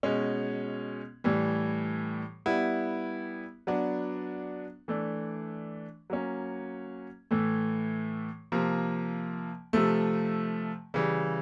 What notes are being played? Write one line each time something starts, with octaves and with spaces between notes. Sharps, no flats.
B2 G#3 C#4
A2 E3 G3
G3 B3 E4
F#3 B3 D4
E3 A3 D4
F#3 A#3 C#4
A2 E3 A3
C3 F3 A#3
C3 F3 A3
C#3 E3 G3